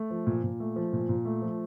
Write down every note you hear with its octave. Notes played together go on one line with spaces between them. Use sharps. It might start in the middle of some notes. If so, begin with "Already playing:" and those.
Already playing: A3
F3
A#2
A#2
A3
F3
A#2
A#2
A3
F3